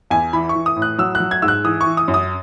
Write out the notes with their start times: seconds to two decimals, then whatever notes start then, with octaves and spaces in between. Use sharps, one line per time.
0.10 E2 G#5
0.33 E3 B5
0.49 C#6
0.55 E3
0.66 D#6
0.76 A2
0.82 F#6
0.98 F#3 E6
1.15 F#6
1.20 F#3
1.31 G#6
1.42 G#2 E6
1.48 F#6
1.64 E3 D#6
1.81 C#6
1.86 E3
1.97 D#6
2.08 F#2
2.14 D#6